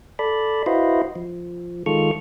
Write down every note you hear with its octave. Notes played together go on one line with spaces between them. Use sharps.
A4 D5 B5
E4 F#4 B4 C5 D#5 F5
F3
D#3 G#3 F4 A4 C#6 F6